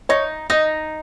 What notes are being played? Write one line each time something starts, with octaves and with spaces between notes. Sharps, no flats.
D#4 C#5
D#4 D#5